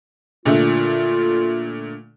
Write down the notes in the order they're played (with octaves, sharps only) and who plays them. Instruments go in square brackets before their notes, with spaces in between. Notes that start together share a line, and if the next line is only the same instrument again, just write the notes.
[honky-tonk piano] A#2 D3 A3 [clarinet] F4